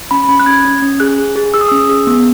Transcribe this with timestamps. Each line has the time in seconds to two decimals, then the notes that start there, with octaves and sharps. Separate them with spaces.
0.11 C#4 B5
0.29 C#4 B5
0.40 F#6
0.46 C#4 G#6
0.65 C#4
0.82 C#4
1.00 G#4 F#6
1.18 G#4
1.36 G#4
1.54 G#4 E6
1.61 D#6
1.68 C#4 E6
1.89 G#4
2.07 B3